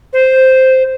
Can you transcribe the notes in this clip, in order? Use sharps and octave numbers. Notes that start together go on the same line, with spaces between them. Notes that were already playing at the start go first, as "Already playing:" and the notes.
C5